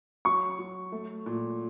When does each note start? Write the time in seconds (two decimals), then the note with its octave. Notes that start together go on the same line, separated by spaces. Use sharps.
0.25 F#3 C#6
0.59 F#3
0.92 A3
1.26 A#2